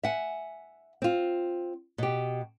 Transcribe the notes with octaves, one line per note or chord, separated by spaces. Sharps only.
E5 F#5 G#5
C4 F4
B2 G4